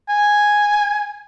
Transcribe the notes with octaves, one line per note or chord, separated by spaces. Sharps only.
G#5